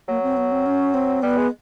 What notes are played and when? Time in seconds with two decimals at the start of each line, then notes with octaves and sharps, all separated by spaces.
0.09 F#3 A#3
0.23 C4
0.37 B3
0.52 C4
0.66 C#4
0.94 C4
1.22 G3 B3
1.37 G#3